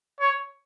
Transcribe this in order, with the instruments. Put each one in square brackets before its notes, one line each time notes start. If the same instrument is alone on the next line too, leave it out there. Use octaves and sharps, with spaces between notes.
[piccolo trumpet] C#5